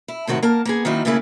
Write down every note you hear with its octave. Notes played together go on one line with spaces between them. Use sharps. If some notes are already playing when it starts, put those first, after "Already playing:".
E4
A2 C3 D#3 F#4
A#3 A#4 A5
A#3 B3 G#4
D#3 F#3 A#3 C4 D#4 E4
A2 C#3 A3 A#3 E4 G#4